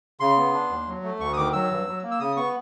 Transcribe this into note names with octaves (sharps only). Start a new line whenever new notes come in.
C#3 C6
B3
D4
D#2
F#3
A3
D2 C#6
D#6
D#3 D6
F#3 E6
G2
F#3
A#3
E6
C#3 D#6
B3 C#6